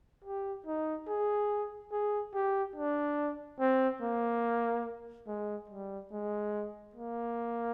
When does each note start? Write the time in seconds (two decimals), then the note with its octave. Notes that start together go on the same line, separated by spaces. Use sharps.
0.24 G4
0.66 D#4
1.08 G#4
1.92 G#4
2.34 G4
2.76 D4
3.59 C4
4.01 A#3
5.27 G#3
5.70 G3
6.11 G#3
6.95 A#3